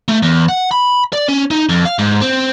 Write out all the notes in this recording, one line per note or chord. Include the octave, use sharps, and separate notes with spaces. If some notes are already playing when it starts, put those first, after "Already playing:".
A3
E2
F#5
B5
D5
C#4
D#4
F2
F5
G#2
C4